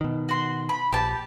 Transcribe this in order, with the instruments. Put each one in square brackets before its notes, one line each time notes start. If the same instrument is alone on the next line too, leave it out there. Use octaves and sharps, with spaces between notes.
[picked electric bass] B2 D#3
[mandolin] F#4 C6
B5
[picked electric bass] A#1 [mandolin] G4 A5